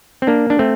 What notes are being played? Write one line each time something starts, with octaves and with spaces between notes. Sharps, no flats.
C4
A#3 D4
D4
A3 C4